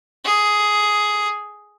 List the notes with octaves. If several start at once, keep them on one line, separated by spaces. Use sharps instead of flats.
G#4